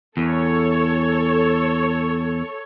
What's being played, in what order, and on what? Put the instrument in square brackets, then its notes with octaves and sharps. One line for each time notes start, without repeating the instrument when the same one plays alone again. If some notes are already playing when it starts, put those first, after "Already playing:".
[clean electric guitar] E2 [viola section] A4 C#5